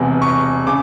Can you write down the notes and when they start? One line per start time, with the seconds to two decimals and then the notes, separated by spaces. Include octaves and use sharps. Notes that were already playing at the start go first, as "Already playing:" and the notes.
Already playing: E1 E2 C3
0.22 C#6
0.67 C#3 D6